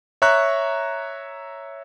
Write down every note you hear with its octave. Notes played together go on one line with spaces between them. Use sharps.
C#5 E5 A#5 C#6 F#6